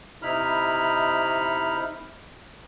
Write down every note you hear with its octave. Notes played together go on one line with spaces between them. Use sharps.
C3 D#4 E4 B5 F6